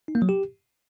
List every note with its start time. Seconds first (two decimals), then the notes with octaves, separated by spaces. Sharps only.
0.08 D#4
0.15 A#3
0.22 F#3
0.29 G4